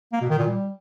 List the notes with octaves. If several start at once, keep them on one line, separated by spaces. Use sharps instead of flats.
A#3
B2
D#3
A#2
G3